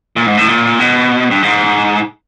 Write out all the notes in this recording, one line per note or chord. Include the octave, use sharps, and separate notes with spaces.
A#2
G#2
A2
A#2
B2
G2
G#2